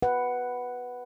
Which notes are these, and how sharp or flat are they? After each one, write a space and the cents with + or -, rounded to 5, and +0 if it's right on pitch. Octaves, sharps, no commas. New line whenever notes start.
B4 +0 F#5 +5